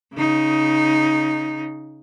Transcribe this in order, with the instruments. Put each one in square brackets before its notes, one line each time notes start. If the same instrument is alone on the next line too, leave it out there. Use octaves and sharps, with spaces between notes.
[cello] C#3 D#4